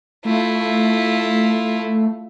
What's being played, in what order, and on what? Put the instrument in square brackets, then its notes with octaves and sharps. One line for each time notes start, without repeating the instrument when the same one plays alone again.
[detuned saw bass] A3 [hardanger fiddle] E4 F4